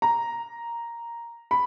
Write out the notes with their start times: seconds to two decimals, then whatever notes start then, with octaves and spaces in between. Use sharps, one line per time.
0.02 A#5
1.51 B5